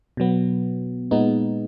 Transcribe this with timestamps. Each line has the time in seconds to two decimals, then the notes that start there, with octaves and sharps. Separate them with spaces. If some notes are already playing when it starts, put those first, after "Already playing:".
0.17 B2 F#3 B3
1.11 A#2 G#3 B3 D#4